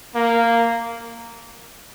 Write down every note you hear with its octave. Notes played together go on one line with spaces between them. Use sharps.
A#3